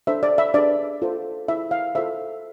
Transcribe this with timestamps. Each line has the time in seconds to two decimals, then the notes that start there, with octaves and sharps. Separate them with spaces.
0.07 D4 A4 C5 E5
0.23 D5
0.38 E5
0.54 D4 G#4 B4 D5
1.02 F4 A4 C5
1.48 E4 G#4 C5 E5
1.71 F5
1.95 F4 A4 C5 E5